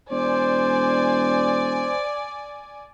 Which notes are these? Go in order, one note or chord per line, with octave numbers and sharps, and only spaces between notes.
E1 C5 D5 G#5